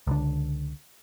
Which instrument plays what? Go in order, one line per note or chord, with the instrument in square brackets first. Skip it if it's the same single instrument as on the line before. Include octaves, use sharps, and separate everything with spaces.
[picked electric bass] C#2 D3